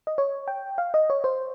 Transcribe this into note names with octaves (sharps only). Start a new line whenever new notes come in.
D#5
C#5
G5
F5
D#5
C#5
C5